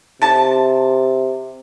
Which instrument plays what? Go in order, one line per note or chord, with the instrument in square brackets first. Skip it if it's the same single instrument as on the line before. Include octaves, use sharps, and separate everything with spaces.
[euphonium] C3 [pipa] A4 A5